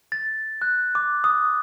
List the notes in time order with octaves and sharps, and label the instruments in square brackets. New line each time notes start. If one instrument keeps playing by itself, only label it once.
[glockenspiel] A6
F#6
D6
D#6